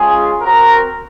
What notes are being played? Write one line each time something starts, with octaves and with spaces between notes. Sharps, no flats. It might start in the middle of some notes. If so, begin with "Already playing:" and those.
Already playing: G#3 C#4 F4 G#4 G#5
C4 F#4 A#4 A#5